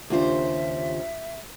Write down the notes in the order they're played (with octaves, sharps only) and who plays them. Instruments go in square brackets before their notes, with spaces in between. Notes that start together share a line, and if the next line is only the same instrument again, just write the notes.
[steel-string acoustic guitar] D#2 C#3 C5 [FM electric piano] D4 F4 G4 [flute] E5